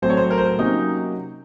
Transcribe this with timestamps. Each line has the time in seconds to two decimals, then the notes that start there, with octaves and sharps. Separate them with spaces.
0.02 A2 F#3 A3 C4 C5
0.10 C#5
0.17 C5
0.30 A#4
0.38 C5
0.45 A#4
0.59 C3 F#3 A#3 C#4 D#4